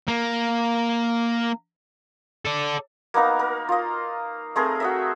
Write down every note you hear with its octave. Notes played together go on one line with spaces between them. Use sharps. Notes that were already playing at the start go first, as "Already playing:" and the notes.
A#3
A4 D5
A#3 B3 D#4 A#4
A#4
F4 D#5
A3 C4 G#4 A#4
F#4 D#5 E5